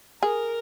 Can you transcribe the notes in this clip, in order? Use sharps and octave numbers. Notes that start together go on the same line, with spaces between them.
G#4 A#4